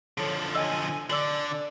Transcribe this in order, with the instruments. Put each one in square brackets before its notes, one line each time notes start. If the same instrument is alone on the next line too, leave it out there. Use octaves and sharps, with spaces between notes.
[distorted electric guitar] D3 F3 [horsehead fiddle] A4 C#5
[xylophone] D#5 E6 [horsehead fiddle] G#5
[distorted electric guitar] D3 [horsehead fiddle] D5 [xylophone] E6 F#7